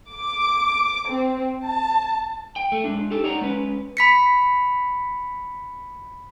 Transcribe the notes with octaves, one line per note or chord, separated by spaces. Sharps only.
D6
C4
A5
G5
A3
G#3 D4
D#4 G4 A4
D#4 C#5 D5 F#5 A#5
G#3 C#4 B4
B5 B6 C#7